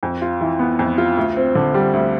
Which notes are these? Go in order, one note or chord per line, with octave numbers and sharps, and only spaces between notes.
F2
F4
E3
B3
F2
F4
D2
C4
D3
G3
D2